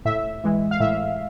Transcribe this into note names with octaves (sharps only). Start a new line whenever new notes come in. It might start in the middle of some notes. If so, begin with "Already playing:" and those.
A2 E5
E3 G#3
F5
A2 E5